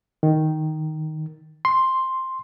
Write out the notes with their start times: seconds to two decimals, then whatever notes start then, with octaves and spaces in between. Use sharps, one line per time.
0.23 D#3
1.65 C6